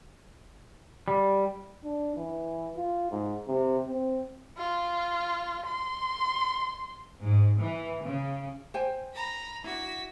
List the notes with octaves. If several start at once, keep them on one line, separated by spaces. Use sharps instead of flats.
G3
D4
E3
F4
G#2
C3
C4
F4
C6
G#2
E3
C#3
C5 G5 G#5
A#5 B5
D4 E4 F#4 B6